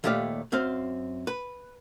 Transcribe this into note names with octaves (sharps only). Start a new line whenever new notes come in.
D#2 A#2 A3 G4 D5 F5
F#2 C4 C5 F5
B4